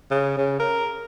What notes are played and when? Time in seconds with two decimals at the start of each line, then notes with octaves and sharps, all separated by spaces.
0.10 C#3
0.37 C#3
0.59 A#4